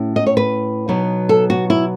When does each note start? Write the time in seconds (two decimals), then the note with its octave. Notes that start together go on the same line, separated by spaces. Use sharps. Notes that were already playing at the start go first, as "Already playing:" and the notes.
Already playing: A2 C#4
0.16 D#5
0.27 C#5
0.37 B4
0.88 B2 F#3 B3 D#4
1.29 A4
1.50 F#4
1.70 E4